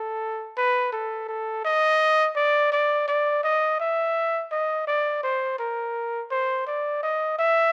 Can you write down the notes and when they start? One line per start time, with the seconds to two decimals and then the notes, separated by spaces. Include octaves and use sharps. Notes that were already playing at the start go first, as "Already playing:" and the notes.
Already playing: A4
0.57 B4
0.92 A4
1.28 A4
1.64 D#5
2.36 D5
2.72 D5
3.08 D5
3.43 D#5
3.80 E5
4.51 D#5
4.87 D5
5.23 C5
5.59 A#4
6.31 C5
6.67 D5
7.03 D#5
7.38 E5